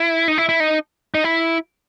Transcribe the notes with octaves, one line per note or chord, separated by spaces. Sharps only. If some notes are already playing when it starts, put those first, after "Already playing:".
Already playing: E4
D#4
E4
E4
D#4
D#4
E4